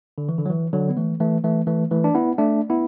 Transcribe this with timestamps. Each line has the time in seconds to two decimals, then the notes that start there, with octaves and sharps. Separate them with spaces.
0.18 D3
0.29 E3
0.38 D3
0.46 F#3
0.50 E3
0.73 D3 F#3
0.89 B3
0.97 E3 A3
1.20 E3 A3
1.44 E3 A3
1.67 E3 A3
1.91 E3 A3
2.04 D4
2.15 B3 E4
2.38 A3 D4
2.70 B3 E4